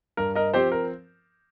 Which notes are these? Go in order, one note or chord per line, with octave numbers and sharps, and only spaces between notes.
G2 A#4
A#4 D#5
F3 C4 G4 C5
A#4